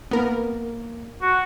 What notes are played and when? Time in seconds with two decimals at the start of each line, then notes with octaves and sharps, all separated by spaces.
0.11 A#3 B3 A#4
1.22 F#4